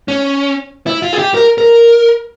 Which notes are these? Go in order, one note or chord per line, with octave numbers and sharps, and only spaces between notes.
C#4
E4
F4
G#4
G4
A#4
A#4